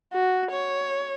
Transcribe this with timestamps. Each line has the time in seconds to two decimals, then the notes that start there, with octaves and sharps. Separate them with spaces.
0.13 F#4
0.51 C#5